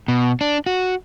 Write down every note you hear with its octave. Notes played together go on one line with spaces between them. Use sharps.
B2
D4
F#4